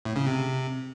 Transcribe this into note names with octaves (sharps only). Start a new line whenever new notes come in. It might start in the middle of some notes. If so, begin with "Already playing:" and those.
A2
C#3
C3